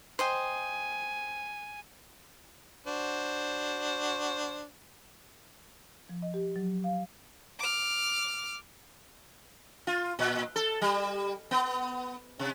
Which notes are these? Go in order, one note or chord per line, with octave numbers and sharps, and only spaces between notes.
C5 D#5 G5 G#5
D4 F#4 C5
F3
D#5
G4
F#3
F5
D6 F6
F4
A#2
A4
G3
B3
C3